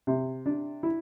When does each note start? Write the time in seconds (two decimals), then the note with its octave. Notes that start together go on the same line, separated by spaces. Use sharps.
0.07 C3
0.46 D4
0.83 E4